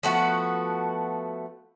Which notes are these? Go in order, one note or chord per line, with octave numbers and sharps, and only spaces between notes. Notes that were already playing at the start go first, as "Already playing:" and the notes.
F3 A3 B3 F#4